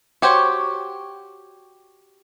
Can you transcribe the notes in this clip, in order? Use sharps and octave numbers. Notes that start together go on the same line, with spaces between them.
F#4 G4 C5 C#5